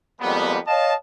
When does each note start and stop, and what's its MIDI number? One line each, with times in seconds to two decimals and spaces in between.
0.21 0.59 41
0.21 0.59 55
0.21 0.59 56
0.21 0.59 58
0.21 0.59 59
0.68 0.94 73
0.68 0.94 75
0.68 0.94 77
0.68 0.94 81